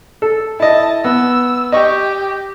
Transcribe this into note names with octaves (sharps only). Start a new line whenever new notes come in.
A4
E4 D#5 A5
B3 E6
G4 D#5 C#6